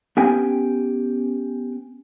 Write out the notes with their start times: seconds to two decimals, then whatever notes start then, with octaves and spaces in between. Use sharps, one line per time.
0.17 B3 C#4 G4 G5 G#5